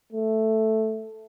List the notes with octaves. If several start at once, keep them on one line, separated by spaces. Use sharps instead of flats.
A3